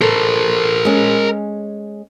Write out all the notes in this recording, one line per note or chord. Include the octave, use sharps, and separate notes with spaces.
A4 A#4 C5
G#3 C#4